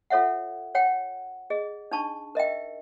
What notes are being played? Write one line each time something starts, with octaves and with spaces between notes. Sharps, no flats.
F4 A4 C#5 E5 F#5
C#5 F#5 G5
G#4 D#5
D4 D#4 A5 C#6
A#4 D#5 E5 G5